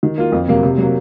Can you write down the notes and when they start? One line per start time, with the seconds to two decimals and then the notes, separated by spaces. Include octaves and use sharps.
0.03 D#3
0.18 A#3 F4
0.32 F2
0.48 C3 F#3 A#3
0.63 C3
0.78 F#3 A#3